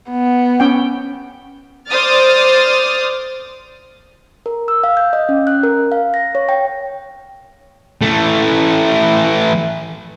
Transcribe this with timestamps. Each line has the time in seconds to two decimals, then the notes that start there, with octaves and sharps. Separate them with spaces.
0.10 B3
0.60 C#4 G5
1.89 C5 D5 D6 D#6 F6 A6
4.46 A#4
4.68 E6
4.84 F5
4.97 G6
5.13 D#5
5.29 C#4
5.47 F#6
5.63 A#4
5.92 F5
6.14 A#6
6.35 C#5
6.49 G5
8.01 E3 A3